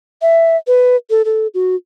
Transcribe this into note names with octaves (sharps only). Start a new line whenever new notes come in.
E5
B4
A4
A4
F#4